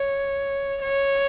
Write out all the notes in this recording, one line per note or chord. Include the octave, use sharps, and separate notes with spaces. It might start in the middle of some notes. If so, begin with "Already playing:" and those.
Already playing: C#5
C#5